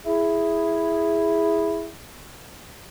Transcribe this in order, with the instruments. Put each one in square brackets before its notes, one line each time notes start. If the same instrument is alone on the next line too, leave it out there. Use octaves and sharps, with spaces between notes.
[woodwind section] E4 G#4